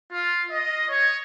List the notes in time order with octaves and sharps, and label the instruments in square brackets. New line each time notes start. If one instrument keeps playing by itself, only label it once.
[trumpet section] F4
D#5
C#5